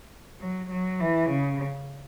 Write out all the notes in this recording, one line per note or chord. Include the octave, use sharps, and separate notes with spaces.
F#3
F#3
E3
C#3